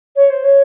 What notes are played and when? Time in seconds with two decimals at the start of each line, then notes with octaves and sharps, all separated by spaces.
0.15 C#5
0.29 C5
0.44 C#5